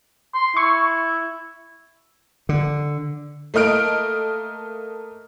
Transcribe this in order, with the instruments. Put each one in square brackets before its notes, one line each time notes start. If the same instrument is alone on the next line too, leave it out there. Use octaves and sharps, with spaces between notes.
[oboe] C6
[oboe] E4 [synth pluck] C#6
[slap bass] D3
[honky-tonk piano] A3 A#3 D#5 F6 D7